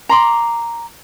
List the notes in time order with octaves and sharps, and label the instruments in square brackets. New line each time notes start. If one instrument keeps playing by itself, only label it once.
[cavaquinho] A#5 C6 D6